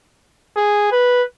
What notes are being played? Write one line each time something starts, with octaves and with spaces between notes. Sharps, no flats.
G#4
B4